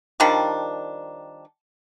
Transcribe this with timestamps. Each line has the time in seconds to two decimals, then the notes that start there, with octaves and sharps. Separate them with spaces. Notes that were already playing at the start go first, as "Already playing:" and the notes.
0.20 D#3 F3 G3 D4